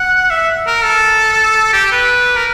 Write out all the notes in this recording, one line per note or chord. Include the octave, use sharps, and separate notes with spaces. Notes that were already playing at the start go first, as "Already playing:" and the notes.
Already playing: F#5
E5
A#4
A4
G4
B4
A#4